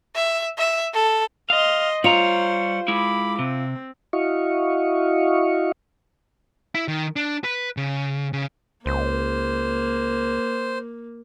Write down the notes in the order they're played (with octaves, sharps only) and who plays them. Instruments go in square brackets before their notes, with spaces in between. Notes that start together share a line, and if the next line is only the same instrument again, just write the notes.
[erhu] E5
E5
A4
[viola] D#5 C6 [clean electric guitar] F5
[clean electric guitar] G3 C#5 A#5 [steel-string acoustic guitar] F4 [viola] C5
[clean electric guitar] G#3 E4 [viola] B5 D6
[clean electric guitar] C3 [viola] C4
[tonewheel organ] E4 F#4 D#5 F5 C#6
[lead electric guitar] E4
D#3
D4
B4
C#3
C#3
[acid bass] C#2 [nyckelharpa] A#3 [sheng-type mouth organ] C5